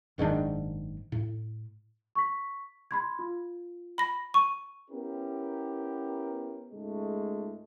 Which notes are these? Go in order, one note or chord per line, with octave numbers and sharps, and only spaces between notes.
F#1 G#2 D#3 D4
A2
C#6 B6
B5 C6 G#6
F4
B5 A#6
C#6 D#7
B3 C#4 E4 G4 A#4
C#2 G#2 G#3 A3